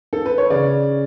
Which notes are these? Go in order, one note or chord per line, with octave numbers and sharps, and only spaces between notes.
A4
B4
C#5
C#3 D5